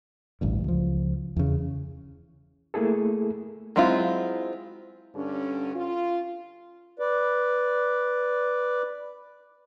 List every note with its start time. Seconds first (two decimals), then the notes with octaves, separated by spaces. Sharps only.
0.41 A1 D2 G2
0.64 C#2 F3
1.36 E2 C#3
2.74 A3 A#3 E4 G#4 A4
3.76 F#3 G#3 C4 E4 F4
5.16 G2 D3 C#4
5.75 F4
6.99 B4 D5